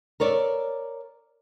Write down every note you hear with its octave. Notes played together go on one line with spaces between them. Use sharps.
A#4 C#5 D5 E5